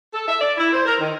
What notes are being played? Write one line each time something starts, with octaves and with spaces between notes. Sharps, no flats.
A4
E5
D5
E4
C5
A#4
D#3